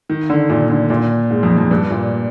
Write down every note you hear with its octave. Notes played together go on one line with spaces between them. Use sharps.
D#3
D3
A#2
D3
A#2
G#2
F2
F2
G2
A#2